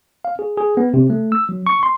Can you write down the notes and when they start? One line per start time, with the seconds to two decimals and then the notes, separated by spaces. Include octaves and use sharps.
0.25 F5
0.39 G#4
0.57 G#4
0.77 B3
0.94 C3
1.10 A3
1.32 E6
1.49 F#3
1.67 C#6
1.83 C6